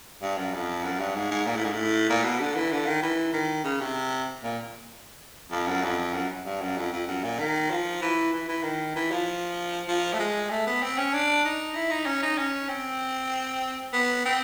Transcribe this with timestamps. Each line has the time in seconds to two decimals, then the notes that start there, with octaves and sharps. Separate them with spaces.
0.22 G2
0.38 F#2
0.54 F2
0.84 F#2
1.00 G2
1.16 G#2
1.31 G#2
1.46 A#2
1.56 A2
1.64 G#2
1.73 A2
2.09 A#2
2.24 B2
2.40 D3
2.55 E3
2.72 D3
2.86 D#3
3.03 E3
3.33 D#3
3.64 C#3
3.81 C3
4.43 A#2
5.51 F2
5.68 F#2
5.84 F2
6.14 F#2
6.45 G2
6.62 F#2
6.77 F2
6.93 F2
7.08 F#2
7.24 A#2
7.39 D#3
7.71 F3
8.02 E3
8.33 E3
8.48 E3
8.63 D#3
8.96 E3
9.11 F3
9.88 F3
10.13 A3
10.20 G#3
10.50 A3
10.67 B3
10.83 C4
10.98 C#4
11.14 D4
11.45 D#4
11.75 E4
11.91 D#4
12.06 C#4
12.23 D#4
12.38 C#4
12.68 C4
13.93 B3
14.26 C4